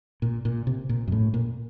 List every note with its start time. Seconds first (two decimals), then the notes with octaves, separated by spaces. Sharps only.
0.22 A#2
0.45 A#2
0.67 C3
0.89 A#2
1.07 F#2
1.12 A2
1.34 A#2